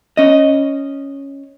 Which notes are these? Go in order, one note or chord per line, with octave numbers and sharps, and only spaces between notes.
C#4 D#5